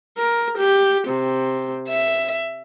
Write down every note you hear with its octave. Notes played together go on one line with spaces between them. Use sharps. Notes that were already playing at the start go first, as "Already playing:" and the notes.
A#4
G4
C3
E5